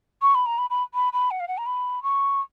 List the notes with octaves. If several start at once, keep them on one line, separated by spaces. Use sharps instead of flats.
C#6
B5
A#5
B5
B5
B5
B5
F#5
F5
F#5
A#5
B5
C#6